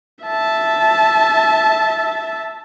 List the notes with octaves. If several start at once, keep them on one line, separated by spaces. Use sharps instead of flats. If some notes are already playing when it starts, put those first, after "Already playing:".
E5 A5